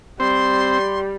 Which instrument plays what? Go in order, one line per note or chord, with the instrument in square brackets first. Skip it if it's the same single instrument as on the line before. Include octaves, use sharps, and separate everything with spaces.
[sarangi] G3 [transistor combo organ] C4 C5 [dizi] C6